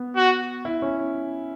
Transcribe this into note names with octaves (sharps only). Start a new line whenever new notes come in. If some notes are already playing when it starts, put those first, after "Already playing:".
Already playing: B3
F#4
E4
C#4